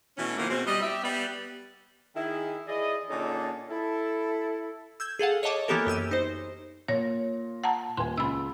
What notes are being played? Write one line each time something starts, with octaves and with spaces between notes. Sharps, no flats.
B2 E3 A3 C#4
B2 D#3 F3 A#3 E4 A#4
B2 C4 G#4
G3 D#5
G4 E5
G3 B3
D#3 E4 G#4
E3 E4 G#4 D5 D#5
A#2 D3 C#4 D#4 G#4 A4
E4 A4
E6 G6 G#6
G#4 A4 F5 F#5
C#5 D#5 E5 A5 D6
E3 A#3 B3 G4 A4 A#4
F#2 G4 E6 D#7
D#4 C5
A#2 C#5 A#6
F#5 A5 A#5
D#1 B4 G#5 C6
C#2 B5 E6